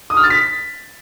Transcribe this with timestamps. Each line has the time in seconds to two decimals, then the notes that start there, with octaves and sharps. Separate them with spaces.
0.10 D#6
0.17 F6
0.24 A6
0.30 B6